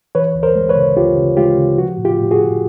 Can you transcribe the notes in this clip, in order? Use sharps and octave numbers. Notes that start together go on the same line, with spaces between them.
E3 B4 C#5
D2
A#4 C5
G#3
B4 C#5
C#3
D2 F4 G4
C#3
G#3 F4 G4
C#3
F3 F#4
A2
F4 G4
A2
F#4 G#4
A2